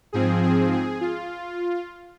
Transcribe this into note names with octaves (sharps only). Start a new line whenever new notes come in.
G#2 F3 C4 G#4
G#4
G#4
F4